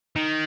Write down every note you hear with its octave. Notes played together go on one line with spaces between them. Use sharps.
D#3